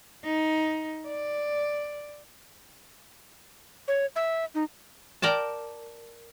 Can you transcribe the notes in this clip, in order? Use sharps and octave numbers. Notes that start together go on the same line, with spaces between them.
D#4
D5
C#5
E5
D#4
A#4 D5 G5 A5